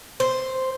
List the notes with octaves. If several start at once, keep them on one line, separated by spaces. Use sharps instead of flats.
C5